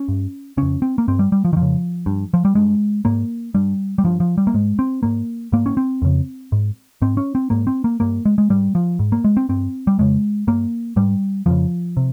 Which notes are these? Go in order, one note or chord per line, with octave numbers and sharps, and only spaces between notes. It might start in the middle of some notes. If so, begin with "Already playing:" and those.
Already playing: C#4
G2
F2 C#3 C#4
C4
A#3
G2 C4
G3
G3
F3
D#3
F2 F3
C#3
G2
F3
G3
G2 G#3
G#2 A#3
G2 G3
G3
G2 F3
F3
G3
A#3
G#2 G#3
C4
G#2 A#3
G#2 A#3
C#4
C4
F2 C#3
G#2
G#2 C4
C#4
C4
G#2 A#3
C4
A#3
G2 A#3
G#3
G#3
G#2 G3
F3
G#2
A#3
G#3
C4
G2 C4
G3
F2 C#3 G#3
G2 A#3
G#2 G3
F2 C#3 F3
C3